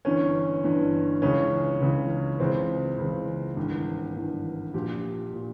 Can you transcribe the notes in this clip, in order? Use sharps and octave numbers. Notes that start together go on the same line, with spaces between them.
G1 G2 E3 C#4
G1 G2 E3
C#2 C#3 E3 C#4
C#2 C#3 E3
C#2 C#3 E3 C4
C#2 C#3 E3
G#1 G2 E3
G#1 G2 E3
A#1 A#2 G4
A#2